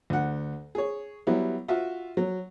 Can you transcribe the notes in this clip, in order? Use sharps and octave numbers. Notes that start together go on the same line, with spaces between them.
D2 F#5
G#4 C#5
F#3 G3 B3 E4
F4 F#4 E5
F#3